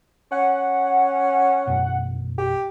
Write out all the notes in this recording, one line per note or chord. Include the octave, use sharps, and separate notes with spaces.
C#4 F#5
A1 F#2 B2
G4